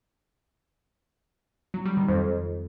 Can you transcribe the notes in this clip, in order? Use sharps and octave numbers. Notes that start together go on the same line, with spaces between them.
F#3
G3
D#3
F2